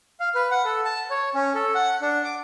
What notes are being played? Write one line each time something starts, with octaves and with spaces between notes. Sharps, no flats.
F5
B4
F#5
A4
A5
C#5
C#4
A4
F#5
D4
D6